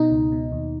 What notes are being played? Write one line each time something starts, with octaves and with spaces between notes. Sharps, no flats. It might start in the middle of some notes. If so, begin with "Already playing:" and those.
Already playing: B2 D#4
C#2
B2
D#2